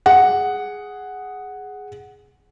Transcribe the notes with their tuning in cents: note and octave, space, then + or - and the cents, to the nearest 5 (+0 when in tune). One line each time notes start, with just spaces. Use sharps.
G#4 +0 F#5 +0